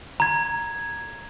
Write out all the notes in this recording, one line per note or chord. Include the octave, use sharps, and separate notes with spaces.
A#5 G#6